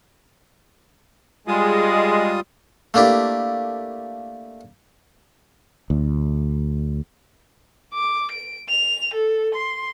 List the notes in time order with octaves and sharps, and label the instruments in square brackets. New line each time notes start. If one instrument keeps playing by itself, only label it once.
[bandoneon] G3 F4 D#6 [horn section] G#3
[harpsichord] A3 A#3 D4 E4 G4
[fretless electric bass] D2
[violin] D6
D7
F7
A4
C6